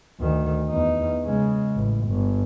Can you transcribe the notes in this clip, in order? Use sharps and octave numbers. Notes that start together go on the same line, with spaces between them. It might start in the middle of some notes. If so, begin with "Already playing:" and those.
D2 D#3
E2 D#4
C#3 G#3
A1
G1